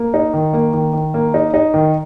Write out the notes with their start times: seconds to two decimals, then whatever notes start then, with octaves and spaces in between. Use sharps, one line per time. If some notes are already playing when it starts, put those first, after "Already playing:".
Already playing: A#3
0.14 D#4
0.34 D#3
0.53 A#3
0.73 D#3
0.93 D#3
1.14 A#3
1.34 D#4
1.54 D#4
1.74 D#3